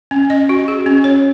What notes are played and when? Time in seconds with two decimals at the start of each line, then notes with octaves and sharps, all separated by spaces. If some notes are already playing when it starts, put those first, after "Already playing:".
0.11 C#4
0.30 D#5
0.49 F#4
0.68 G#4
0.86 C#4
1.04 C#5